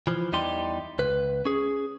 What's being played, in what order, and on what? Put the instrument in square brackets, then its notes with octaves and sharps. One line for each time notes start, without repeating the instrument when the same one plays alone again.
[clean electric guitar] E3 F3
E2 E3 G3 D#4 G4 C6
C#2 B4
C#4 G#4